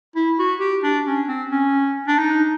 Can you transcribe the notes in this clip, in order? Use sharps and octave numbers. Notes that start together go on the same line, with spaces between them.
E4
F#4
G4
D4
C#4
C4
C#4
D4
D#4